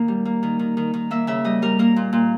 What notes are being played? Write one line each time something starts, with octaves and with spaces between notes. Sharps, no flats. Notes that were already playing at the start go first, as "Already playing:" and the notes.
Already playing: D#3 A#3
G3
A#3
D#3
D#3
D#3
D#3
A#3 E5
C#3 E5
G3 D#5
G3 A#4
A#3 A#4
A#2
A#2